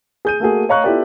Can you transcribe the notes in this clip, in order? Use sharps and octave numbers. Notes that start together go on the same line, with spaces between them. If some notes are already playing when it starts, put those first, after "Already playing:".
G#4 G6 D#7
A3 A#3 F#4 G#4
C#5 D#5 F5 A#5 C#6 F#6
B3 E4 F4 G4 A4 D5